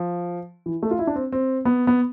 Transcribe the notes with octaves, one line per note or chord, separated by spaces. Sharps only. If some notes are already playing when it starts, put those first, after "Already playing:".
Already playing: F3
E3
A3
F4
E4
D4
C4
C4
B3
B3